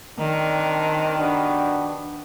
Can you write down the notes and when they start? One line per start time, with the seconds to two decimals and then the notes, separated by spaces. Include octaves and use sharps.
0.18 D#3 C4 D4 A#4
1.17 B3 D4 F#4 G4